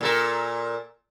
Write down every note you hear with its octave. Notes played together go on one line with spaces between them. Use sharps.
A#2 A4 A#4